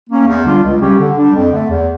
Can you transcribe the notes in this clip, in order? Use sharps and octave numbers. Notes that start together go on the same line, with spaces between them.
A#3 C#4
E2
D3 G3 D4 F4
C#2
C#3 G3 C#4 G4
D3
G3 D4
F2
D3 A3
E2